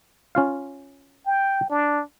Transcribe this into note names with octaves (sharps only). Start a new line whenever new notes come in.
C#4 F4 F5
G5
D4